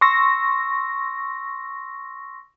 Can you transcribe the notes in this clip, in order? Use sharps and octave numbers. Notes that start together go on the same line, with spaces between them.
C6 C#6 E6 A#6